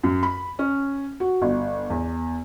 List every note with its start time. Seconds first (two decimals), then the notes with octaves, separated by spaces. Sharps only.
0.03 F#2
0.23 B5
0.59 C#4
1.20 F#4
1.42 G1
1.90 E2